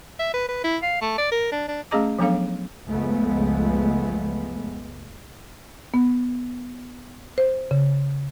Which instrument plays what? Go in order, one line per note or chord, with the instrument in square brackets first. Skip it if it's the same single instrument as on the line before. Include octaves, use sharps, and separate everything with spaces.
[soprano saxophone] E5
B4
B4
E4
F5
A3
D5
A#4
D4
D4
[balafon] A3 C#4 G#4 D#5 A#5 D6
F3 F#3 B3 D4 A4 F5
[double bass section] F#1 C#2 F3 G#3 A3 B3
[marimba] B3
C5
C#3